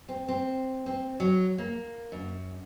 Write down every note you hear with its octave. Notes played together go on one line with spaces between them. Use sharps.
C4
C4
C4
F#3
A#3
F#2